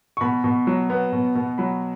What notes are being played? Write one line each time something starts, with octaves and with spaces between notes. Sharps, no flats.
C#6
B2 B5
B2
F#3
B3
B2
B2
F#3 B5